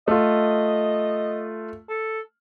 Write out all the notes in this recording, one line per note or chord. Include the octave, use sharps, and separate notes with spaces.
A3 F4 D#5
A4